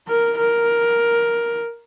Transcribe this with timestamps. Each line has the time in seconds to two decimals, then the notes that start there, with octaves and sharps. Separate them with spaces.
0.08 A#4
0.37 A#4